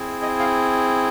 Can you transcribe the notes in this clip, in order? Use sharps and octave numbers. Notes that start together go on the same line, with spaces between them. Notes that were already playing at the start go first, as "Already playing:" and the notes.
Already playing: C4 E4 G#4
D#5
F5